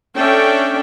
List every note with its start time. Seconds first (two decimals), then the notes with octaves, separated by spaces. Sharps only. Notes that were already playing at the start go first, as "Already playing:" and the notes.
0.16 C#4 D4 A4 D5 E5 G5